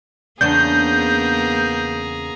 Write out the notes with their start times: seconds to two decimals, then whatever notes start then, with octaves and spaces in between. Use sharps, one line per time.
0.41 E2 C#3 A#3 B3 D4 G#4 A#5 G6